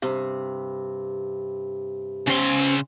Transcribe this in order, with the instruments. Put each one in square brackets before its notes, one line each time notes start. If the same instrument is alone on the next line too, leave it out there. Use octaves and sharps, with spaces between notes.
[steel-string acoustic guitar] G2 C3
[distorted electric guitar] C#3 C6 [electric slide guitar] C#4 C5 C#5